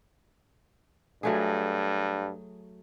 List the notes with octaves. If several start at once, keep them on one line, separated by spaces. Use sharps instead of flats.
G2 F#3 A3 G#4